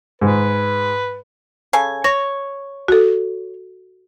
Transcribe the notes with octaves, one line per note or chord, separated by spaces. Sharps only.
G#2 B4
C#3 A4 G#5
C#5 A#6
F#4 A4